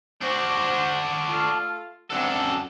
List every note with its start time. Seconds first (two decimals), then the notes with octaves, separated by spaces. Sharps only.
0.22 D4 F#4 C5
1.28 A3 F4 A4
2.10 F#2 C4 D4 A4 F#5